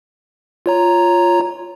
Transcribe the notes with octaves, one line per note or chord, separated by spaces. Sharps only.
F4 C#5 A#5